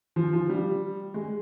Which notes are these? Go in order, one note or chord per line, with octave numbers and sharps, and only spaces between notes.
F3
F3
G3
G#3